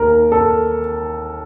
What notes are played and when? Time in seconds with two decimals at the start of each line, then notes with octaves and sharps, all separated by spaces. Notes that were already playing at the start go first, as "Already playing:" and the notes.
Already playing: D#2 D#3 A#4
0.32 A4